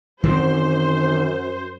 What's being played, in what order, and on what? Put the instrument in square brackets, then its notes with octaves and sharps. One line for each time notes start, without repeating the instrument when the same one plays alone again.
[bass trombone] F#2 [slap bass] D#3 E3 C4 [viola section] C5